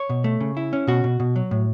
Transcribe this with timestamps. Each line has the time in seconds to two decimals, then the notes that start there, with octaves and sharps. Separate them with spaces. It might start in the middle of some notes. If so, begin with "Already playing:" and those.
Already playing: C#5
0.09 B2
0.24 A3
0.40 C#3
0.57 E4
0.73 C#4
0.87 B2 F#4
1.04 B2
1.20 B2
1.36 F#3
1.51 A2